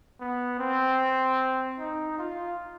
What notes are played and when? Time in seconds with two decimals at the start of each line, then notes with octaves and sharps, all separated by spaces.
0.20 B3
0.59 C4
1.79 D#4
2.18 F4